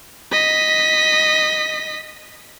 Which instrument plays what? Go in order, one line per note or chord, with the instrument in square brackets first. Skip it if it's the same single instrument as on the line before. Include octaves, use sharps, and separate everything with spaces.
[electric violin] D#5 B6